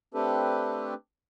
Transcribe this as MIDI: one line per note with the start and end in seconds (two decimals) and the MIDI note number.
0.14 0.94 57
0.14 0.94 60
0.14 0.94 62
0.14 0.94 67
0.14 0.94 69
0.14 0.94 71